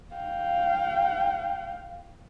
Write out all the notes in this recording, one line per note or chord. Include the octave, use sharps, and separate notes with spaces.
F5 G5